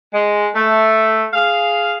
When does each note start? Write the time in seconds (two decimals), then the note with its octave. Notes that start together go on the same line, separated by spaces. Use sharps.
0.13 G#3
0.55 A3
1.34 G#4 F5